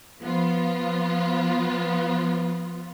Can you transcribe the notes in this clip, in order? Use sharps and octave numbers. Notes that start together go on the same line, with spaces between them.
F3 B3 F4